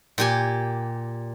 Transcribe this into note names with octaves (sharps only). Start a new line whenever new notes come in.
A#2 G4 G#5